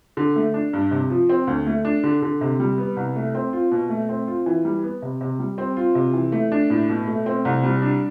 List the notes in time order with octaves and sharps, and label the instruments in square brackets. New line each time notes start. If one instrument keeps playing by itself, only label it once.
[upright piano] D3
A3
D4
G2
C3
F3
C4
D2
A3
D4
D3
D3
C3
G3
B3
C2
A3
C4
F4
B2
A3
C4
F4
E3
G3
B3
C3
C3
G3
C4
F4
C3
E3
A3
D4
A2
B2
A3
C4
C2
G3
D4